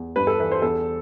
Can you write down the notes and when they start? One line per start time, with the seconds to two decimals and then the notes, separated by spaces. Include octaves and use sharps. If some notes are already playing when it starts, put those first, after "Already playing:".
Already playing: E2
0.16 G2 B4
0.27 A4
0.39 E3 B4
0.52 C5
0.62 E2 A4